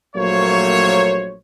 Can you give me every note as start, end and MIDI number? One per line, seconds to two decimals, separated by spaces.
0.15 1.35 34
0.15 1.35 54
0.15 1.35 57
0.15 1.35 58
0.15 1.35 72
0.15 1.35 73